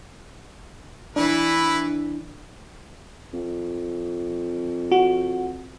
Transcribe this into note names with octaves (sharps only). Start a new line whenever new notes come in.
E3 D4 E4 B4
F2
F#4